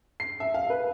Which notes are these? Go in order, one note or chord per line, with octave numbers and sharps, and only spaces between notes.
C7
E5
F5
B4